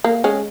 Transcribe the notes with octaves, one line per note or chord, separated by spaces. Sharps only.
A#3
G#3 C#4